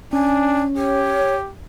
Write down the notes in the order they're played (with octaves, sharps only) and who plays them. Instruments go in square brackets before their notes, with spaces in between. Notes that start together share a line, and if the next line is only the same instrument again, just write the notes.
[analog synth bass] C#4 [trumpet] D4 [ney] G#5
[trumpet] G4 [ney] C#5